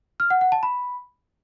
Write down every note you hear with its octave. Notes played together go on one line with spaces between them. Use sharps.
F6
F#5
F#5
A5
B5